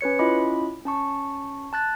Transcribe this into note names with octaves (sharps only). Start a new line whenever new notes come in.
C#4 B4 C#5 C#7
C#4 E4 F4 D#5 B5 D6
C#4 A5 C#6
A5 F#6 A6